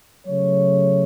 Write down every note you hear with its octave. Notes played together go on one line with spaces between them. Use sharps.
C#3 F#3 A3 C#5